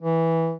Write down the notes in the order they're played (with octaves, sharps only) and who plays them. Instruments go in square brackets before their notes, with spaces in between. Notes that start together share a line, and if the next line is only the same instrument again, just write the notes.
[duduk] E3